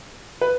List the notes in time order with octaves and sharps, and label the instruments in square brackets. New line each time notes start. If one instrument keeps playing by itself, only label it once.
[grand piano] B4